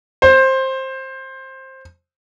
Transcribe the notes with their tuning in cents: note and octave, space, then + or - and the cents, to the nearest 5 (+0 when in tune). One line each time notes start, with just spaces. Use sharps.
C5 +15